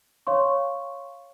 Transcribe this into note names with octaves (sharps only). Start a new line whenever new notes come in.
C#5 F5 C6 C#6